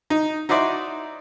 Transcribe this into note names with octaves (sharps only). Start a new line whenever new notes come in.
D#4
D#4 E4 F#4 C5 D5 E5